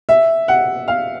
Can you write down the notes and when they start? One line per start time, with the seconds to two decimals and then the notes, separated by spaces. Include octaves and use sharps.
0.09 E5
0.48 F#5
0.88 F5